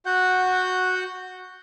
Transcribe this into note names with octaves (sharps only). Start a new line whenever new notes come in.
F#4 F#5 G6